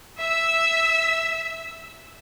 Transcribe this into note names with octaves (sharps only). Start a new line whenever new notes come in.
E5 E6